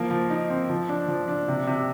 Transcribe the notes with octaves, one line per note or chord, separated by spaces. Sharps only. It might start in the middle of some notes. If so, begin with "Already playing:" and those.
Already playing: F3 A#3
F3
D#4
C4
F3
D4
F3
D4
C3
C3